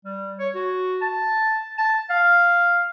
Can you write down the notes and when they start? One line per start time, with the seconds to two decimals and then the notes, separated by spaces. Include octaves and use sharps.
0.05 G3
0.39 C#5
0.55 F#4
1.01 A5
1.78 A5
2.10 F5